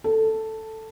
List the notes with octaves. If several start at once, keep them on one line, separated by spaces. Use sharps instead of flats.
A4